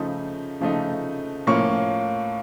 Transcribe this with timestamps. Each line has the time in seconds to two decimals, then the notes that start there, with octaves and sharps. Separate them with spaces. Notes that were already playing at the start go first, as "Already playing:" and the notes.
Already playing: C#3 F3 A3 D#4
0.60 C#3 F3 A3 D#4
1.47 A2 F3 A#3 C#4 F4 C#6